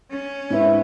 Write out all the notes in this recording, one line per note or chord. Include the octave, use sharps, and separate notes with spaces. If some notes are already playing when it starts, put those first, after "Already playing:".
C#4
G#2 C4 D4 E4 B4